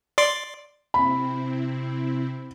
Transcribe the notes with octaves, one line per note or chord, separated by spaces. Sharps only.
D5 C6 D6
C3 C4 E4 B5